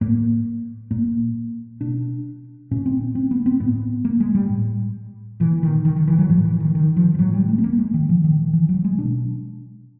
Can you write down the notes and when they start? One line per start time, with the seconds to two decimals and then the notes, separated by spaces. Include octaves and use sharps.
0.01 A2 A#3
0.91 A#2 A#3
1.81 B2 D4
2.71 A#2 C#4
2.86 C4
3.15 C4
3.31 B3
3.46 C4
3.60 A2 B3
4.05 A#3
4.20 G#3
4.35 G3
4.50 A2
5.40 A#2 E3
5.63 D#3
5.85 D#3
5.96 D#3
6.08 E3
6.18 F#3
6.29 A2 F3
6.44 E3
6.60 D#3
6.75 D#3
6.96 F3
7.14 F3
7.19 A2 F#3
7.34 G3
7.49 A3
7.58 B3
7.64 A#3
7.79 G#3
7.94 D#3
8.09 A#2 F3
8.24 D#3
8.53 E3
8.69 F#3
8.84 G#3
8.99 B2 D4